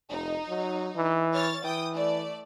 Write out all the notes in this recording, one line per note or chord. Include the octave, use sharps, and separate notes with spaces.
F1 D#4
F#3
E3
C#5 F6 A6
E3 G5 D#6
A3 D5